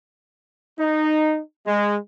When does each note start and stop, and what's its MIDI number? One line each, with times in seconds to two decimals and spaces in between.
0.79 1.39 63
1.66 1.96 56